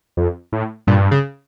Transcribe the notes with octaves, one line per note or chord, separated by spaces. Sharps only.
F2
A2
G2 A#2
C#3